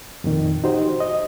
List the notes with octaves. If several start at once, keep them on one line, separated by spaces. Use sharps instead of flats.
F2 A#2 D#3
D#4 F#4 G4 C5
D#5